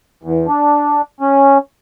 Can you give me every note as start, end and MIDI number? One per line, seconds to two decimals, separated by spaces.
0.23 0.47 40
0.48 1.02 62
1.20 1.58 61